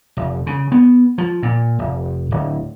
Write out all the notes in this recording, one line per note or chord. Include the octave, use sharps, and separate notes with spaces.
F1
C#3
B3
F3
A#2
F1
D1